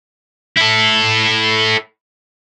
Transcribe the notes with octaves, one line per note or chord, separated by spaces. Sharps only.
E4 A4